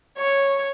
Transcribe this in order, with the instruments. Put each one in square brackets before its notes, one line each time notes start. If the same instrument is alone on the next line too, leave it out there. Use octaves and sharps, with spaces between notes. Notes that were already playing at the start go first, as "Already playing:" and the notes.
[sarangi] C#5